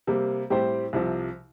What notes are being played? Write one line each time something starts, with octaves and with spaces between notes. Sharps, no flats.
C3 G3 A#3
A2 G3 C4 G4 C5
C2 C3 F3